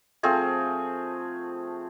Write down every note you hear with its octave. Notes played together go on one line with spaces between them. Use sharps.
F3 A3 C4 G#4